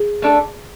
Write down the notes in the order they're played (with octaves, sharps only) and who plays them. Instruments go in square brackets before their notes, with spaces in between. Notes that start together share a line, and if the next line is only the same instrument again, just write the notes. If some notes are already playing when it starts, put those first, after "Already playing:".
Already playing: [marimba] G#4
[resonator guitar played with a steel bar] A3 D4 A4